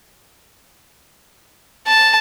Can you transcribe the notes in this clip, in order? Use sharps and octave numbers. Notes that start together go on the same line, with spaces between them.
A5